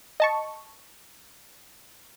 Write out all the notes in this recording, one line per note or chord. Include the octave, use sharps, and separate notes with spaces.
D#5 A5 C#6